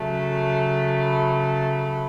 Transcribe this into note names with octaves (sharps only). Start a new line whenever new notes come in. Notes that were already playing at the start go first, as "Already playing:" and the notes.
Already playing: C#3 F#3 A3 A5
B5
A5
B5